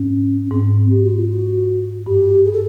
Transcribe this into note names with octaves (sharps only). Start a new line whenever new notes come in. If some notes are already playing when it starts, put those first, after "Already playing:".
Already playing: G#2 C#4
C#4
G#2 C4
G4
F#4
F4
F#4
G2 G4
G#4
A4